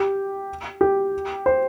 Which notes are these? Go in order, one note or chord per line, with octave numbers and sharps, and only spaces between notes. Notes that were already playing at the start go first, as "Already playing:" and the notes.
Already playing: G4
G4
C5